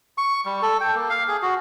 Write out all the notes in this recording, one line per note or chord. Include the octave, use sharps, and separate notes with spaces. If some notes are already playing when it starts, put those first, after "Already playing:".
C#6
G3
A4
G5
A#3
F5
G#4
F#4